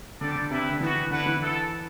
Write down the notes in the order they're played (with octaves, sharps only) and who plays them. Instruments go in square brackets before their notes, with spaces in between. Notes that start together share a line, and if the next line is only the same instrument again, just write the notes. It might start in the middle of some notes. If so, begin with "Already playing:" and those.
[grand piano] D3 [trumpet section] G3 D4 A4 D5
[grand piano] D3
[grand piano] C3 [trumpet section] E4 G4 B4 E5
[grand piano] D3
[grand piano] E3 [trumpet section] G3 B3 F#4
[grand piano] D3 [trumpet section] E4 B4 F#5
[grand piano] E3
[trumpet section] B3 E4 A4